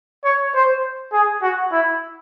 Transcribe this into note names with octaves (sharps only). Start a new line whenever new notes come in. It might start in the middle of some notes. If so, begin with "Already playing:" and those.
C#5
C5
G#4
F#4
E4